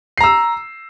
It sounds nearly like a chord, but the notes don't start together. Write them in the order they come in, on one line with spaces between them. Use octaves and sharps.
C7 A#5 E6